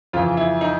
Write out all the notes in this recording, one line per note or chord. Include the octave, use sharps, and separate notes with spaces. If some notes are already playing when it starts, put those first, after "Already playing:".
F2 C#3 E3 F4
E4
D#4